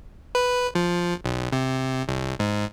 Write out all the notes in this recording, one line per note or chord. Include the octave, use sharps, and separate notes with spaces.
B4
F3
B1
C3
C2
G#2